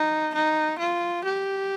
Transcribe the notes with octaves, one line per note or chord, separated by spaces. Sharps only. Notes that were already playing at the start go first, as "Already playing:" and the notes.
Already playing: D#4
D#4
F4
G4